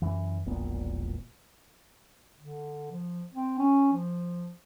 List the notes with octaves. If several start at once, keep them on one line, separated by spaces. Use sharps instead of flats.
F#2 E3
E1 A#1 A#2 B3
D3
F3
C4
C#4
F3